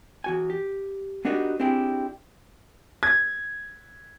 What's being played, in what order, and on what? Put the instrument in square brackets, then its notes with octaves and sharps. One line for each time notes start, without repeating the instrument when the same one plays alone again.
[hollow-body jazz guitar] E2 F#4 G#5
G4
B3 D4 D#4 F#4 G4 A#4
C4 D4 E4 G4 G#4
[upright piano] G#6